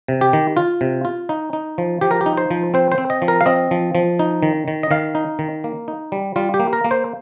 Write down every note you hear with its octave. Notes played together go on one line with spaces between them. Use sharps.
C3
G4
D#3
F4
C3
F4
D#4
D#4
F3
F3 G4
A#4
G4
D#4
C5
F3
C4 C5
C5
C4
D#5
F3
A#4
F5
C4 D#5
F3
F3
D#4
D#3
D#3
D#5
D#3 F5
D#4
D#3
A#3
D#4
G3
G3 F4
G4
A#3
A#4
A#3
C5